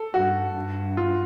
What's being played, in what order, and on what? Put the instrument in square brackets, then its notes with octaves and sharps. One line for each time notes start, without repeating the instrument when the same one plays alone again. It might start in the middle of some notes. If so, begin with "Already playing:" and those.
Already playing: [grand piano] A4
[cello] G2 [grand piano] F#4
[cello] G2
[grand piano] F4